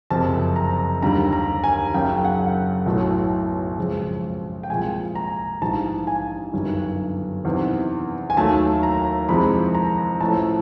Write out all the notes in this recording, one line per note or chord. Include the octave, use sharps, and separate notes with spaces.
F#1 F2 C3 A5
A#5
D#2 D3 G3 A#5
A#5
G#5
F#1 F#2 C#3 G5
F#5
B1 A2 F#3 A3
F2 C#3 F3 G#3
G5
C2 A#2 F3 G#3 G#5
A#5
A#1 G#2 E3 G3 A5
G#5
G1 F#2 D#3 G3
E2 C3 D#3
G#5
D#2 D#3 F#3 A3 A5
A#5
F2 C3 E3 G#3 B5
A#5
A1 A2 F3 A3 A5